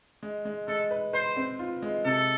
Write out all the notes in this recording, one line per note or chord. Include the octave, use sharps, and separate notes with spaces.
G#3
G#3
G#3 A4
B4
B4 C5
C4
F4
G#3
C3 A4